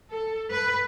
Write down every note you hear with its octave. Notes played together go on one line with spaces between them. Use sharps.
A4
B4